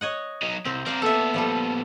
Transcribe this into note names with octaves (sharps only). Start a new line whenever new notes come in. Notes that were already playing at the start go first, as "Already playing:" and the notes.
C#5 D#5 F#5
F#3 D#4
C2 C4
C4 A#4 C5 D5 F5
A#2 B3 A4 E5
F3 G3 A4